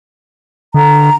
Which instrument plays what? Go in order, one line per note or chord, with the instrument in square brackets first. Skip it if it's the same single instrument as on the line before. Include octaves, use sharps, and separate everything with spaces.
[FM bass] D3 [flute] A#5